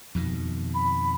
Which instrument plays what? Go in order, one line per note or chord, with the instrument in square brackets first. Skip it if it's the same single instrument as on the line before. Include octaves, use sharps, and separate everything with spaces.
[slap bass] F2 B2 D#3
[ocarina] B5